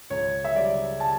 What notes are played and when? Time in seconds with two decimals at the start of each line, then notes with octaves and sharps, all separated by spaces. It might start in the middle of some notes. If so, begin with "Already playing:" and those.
0.10 C#2 C#5
0.44 E5
0.56 C#3 G3 D5
1.00 A5